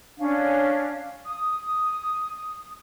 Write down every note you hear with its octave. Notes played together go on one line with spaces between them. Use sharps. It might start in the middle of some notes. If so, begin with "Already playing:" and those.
C#4 D4 F5
D#6